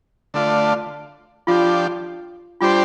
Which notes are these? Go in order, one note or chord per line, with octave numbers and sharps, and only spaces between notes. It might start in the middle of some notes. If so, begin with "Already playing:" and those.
D3 A3 F4 D5
F3 D4 F4 G4
G3 D4 F4 G4 C5